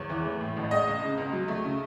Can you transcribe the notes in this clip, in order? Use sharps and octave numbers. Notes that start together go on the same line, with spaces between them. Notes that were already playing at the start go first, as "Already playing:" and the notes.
Already playing: E2 C#5
E3
A3
A2
A1
G#3 D#5
C#2
C#3
C#2
F#3
A3
C#3